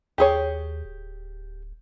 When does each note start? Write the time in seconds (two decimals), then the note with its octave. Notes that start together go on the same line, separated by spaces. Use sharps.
0.18 D#2 G4 G#4 C#5
0.85 D1